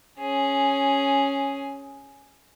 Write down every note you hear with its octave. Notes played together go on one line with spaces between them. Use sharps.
C#4 G#4